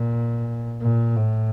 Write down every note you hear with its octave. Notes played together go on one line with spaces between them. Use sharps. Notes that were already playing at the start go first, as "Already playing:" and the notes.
Already playing: A#2
A#2
A2